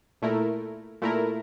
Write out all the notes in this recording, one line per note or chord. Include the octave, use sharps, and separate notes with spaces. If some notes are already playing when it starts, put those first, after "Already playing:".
A#2 A3 E4 A#4
A#2 A3 E4 A#4